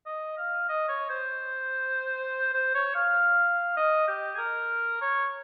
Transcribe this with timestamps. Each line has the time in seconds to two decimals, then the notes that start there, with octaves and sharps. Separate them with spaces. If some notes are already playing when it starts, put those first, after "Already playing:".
0.06 D#5
0.38 F5
0.69 D#5
0.88 C#5
1.10 C5
2.54 C5
2.75 C#5
2.95 F5
3.77 D#5
4.08 G4
4.35 G#4
4.38 A#4
5.01 C#5